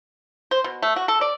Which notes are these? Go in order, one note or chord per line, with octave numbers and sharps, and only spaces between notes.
C5
B2
A3
F#4
A4
D5